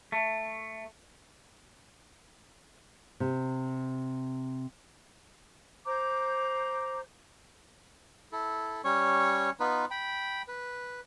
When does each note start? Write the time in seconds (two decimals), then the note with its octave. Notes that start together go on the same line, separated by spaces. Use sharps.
0.12 A3
3.20 C3
5.86 C5 A#5 D6 G6
8.32 E4 A4
8.84 G3 C#4 C#5 C#6
9.60 B3 D#4 F4 B4
9.91 G5 B5
10.48 B4